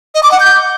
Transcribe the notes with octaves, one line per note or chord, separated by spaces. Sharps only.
D#5
D6
F#5
G6